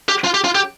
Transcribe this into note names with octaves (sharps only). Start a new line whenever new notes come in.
G4
F4
G4
F4
G4